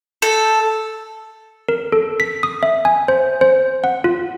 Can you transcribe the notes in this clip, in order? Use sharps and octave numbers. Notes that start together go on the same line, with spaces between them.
A4
A#4
A4
B6
D#6
E5
G#5
C5
C5
F#5
F4